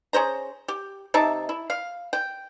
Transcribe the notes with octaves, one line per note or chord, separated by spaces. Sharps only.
C#4 G#4 C5 A#5
G4
C3 D#4 E5 A5
E4
F5
G5